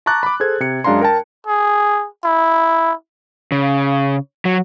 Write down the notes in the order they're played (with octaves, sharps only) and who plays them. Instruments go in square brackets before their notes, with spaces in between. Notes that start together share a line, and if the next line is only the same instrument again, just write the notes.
[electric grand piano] A5 A#5 C#6 D6 F#6 A6
B5 D6
G#4 A4 C5 G#6
C3 C#7
F#2 G#3 D4 F5 A#5 C6
A#4 G5 A5
[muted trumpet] G#4
E4
[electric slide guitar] C#3
F#3